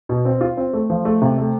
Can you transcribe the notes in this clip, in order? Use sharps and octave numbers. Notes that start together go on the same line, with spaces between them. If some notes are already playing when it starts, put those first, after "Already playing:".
B2
C4
F4
C4
A3
F3
A3
C3
A3